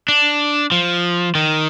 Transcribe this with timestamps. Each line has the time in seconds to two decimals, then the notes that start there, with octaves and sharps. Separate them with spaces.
0.08 D4
0.72 F3
1.35 D#3